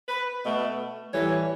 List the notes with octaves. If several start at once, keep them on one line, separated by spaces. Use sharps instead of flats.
B4
B2 A3
A2 E3 G3 C#5